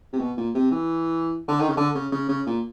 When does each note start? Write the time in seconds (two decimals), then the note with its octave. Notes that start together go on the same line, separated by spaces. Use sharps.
0.13 C3
0.19 B2
0.37 A#2
0.55 C3
0.72 E3
1.48 D3
1.60 D#3
1.69 C#3
1.77 D3
1.95 C#3
2.12 C#3
2.29 C#3
2.47 A#2